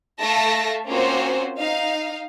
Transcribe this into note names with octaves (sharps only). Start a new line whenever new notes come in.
A3 A4 E5 F5 A5 A#6
A#3 C4 C#4 F4 F#4 C5
D#4 F5